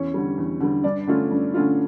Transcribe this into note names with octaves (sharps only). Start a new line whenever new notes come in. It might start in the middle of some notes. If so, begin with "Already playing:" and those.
Already playing: E2 C#4 C#5
D3 G3
E2
D3 G3
G2 D4 D5
D3 A3 C#4 F4
G2
D3 A3 C#4 F4